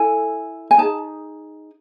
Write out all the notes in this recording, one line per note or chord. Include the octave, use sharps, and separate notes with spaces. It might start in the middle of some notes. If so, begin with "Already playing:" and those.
Already playing: E4 A4 G#5
G#5
D#4 G#4 A5